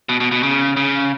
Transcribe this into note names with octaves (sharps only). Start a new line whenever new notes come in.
B2
B2
B2
C#3
C#3